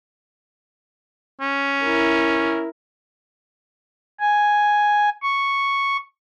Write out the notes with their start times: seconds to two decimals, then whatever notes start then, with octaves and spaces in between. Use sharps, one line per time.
1.41 C#4
1.84 E4 A#4
4.20 G#5
5.23 C#6